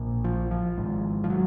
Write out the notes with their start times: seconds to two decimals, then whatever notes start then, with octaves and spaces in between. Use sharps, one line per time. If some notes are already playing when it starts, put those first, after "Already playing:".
Already playing: A#1 A#2
0.24 F3
0.51 F3
0.77 G#1 G#2
1.24 F3
1.30 F#3